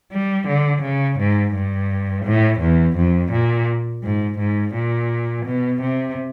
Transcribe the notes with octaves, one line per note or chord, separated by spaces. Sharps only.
G3
D3
C#3
G#2
G2
A2
E2
F2
A#2
G#2
G#2
A#2
B2
C3